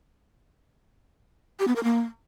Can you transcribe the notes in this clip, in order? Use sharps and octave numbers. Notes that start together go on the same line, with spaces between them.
G4
B3
A#4
A#3